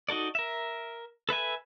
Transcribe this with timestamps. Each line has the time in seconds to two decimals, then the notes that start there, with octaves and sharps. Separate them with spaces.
0.09 D#4 F#4 A4 D5
0.35 A#4 E5
1.29 A4 B4 E5 G#5